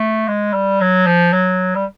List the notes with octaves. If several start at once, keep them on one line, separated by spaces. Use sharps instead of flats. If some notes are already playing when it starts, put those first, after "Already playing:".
Already playing: A3
G#3
G3
F#3
F3
F#3
G3